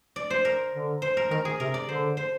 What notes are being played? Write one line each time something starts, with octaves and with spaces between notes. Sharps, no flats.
D5
C5
A#4
D3
C5
A#4
D#3 A#4
G#4
C3 A#4
D5
D3 C5
C5